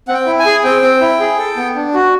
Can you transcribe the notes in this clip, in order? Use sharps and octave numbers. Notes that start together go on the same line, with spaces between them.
C4 F#5
G5
E4
G#5
G#4
C4 G5
C4
E4
G#4
A4
B3
D4
F#4